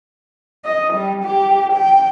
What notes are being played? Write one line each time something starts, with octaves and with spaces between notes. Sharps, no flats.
D#5
G3
G4
G5